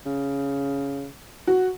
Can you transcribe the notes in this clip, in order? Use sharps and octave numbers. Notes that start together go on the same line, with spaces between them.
C#3
F#4